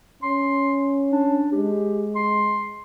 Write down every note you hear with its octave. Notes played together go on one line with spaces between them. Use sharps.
C#4 C6
D4
G#3 G4
C6